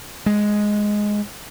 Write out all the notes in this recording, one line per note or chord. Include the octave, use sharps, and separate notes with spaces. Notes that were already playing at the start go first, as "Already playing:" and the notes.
G#3